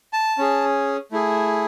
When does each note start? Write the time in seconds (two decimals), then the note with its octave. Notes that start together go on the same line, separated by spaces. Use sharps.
0.13 A5
0.38 C#4 G#4
1.12 A3 E4 G#4